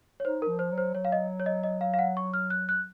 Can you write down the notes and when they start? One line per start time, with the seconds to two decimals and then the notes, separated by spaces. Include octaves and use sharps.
0.20 C#5
0.24 D#4 C5
0.42 A#4
0.48 F3
0.59 C5
0.71 F#3
0.78 C5
0.95 F#3 C#5
1.05 F5
1.12 D#5
1.40 C#5
1.46 D#5
1.64 D#5
1.81 F5
1.94 F5
1.99 F#5
2.17 C#6
2.34 F6
2.50 F#6
2.69 F#6